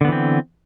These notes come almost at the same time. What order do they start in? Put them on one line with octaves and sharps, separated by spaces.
D3 B3 E3 C4